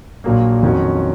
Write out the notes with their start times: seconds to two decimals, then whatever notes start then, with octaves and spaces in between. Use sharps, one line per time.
0.24 A#1 A#2 F#3 A#3
0.63 F2 D#3 F#3 C#4 F#4